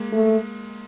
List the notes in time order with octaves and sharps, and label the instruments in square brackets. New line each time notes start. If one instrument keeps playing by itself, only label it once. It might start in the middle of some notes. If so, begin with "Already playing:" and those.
Already playing: [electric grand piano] G#3 A#3
[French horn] A3